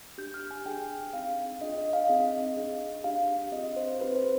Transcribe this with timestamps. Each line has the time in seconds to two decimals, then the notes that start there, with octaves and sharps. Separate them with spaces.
0.18 D4 G4 G6
0.34 F6
0.51 G#5
0.65 D4 G#4 G5
1.13 C4 D#4 G#4 F5
1.61 D4 F4 G#4 D#5
1.78 D#5
1.93 F5
2.09 C4 D#4 G#4 D#5
2.57 D4 G#4
3.04 D4 G4 F5
3.52 C4 F4 G#4 D#5
3.76 C5
4.00 C4 D#4 G4 B4
4.16 C5